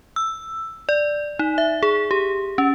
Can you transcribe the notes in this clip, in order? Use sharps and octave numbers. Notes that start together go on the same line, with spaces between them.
E6
D5
D#4
E5
G#4
G4
C#4